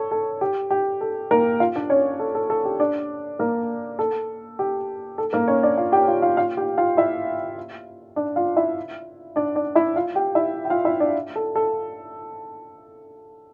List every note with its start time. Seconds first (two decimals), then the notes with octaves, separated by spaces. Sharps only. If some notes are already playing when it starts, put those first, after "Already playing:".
Already playing: A4 C#5
0.11 A4
0.41 G4
0.71 G4
1.01 A4
1.31 A#3 A#4
1.60 F4 F5
1.76 D4 D5
1.90 C#4 C#5
2.19 A4
2.35 A4
2.50 A4
2.65 G4
2.80 D4 D5
3.39 A#3 A#4
3.99 A4
4.59 G4
5.18 A4
5.33 A#3 A#4
5.48 C#4 C#5
5.63 D4 D5
5.78 F4 F5
5.92 G4 G5
6.08 F4 F5
6.22 F4 F5
6.37 F4 F5
6.57 G4 G5
6.78 F4 F5
6.97 E4 E5
8.16 D4 D5
8.36 F4 F5
8.56 E4 E5
9.36 D4 D5
9.55 D4 D5
9.75 E4 E5
9.96 F4 F5
10.15 G4 G5
10.35 E4 E5
10.65 G5
10.70 F4 F5
10.85 E4 E5
11.00 D4 D5
11.36 A4
11.56 A4